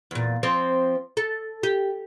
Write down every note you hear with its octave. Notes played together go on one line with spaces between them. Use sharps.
E2 A#2
F3 C4 C5
A4
G4